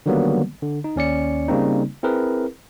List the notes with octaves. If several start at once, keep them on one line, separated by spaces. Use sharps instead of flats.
D3 D#3 F#3 G3 A#3 B3
D3
D#4
D#2 C#4 D5 C#7
C#3 G3 A#3 C4 D#4
C4 E4 G#4 A#4 B4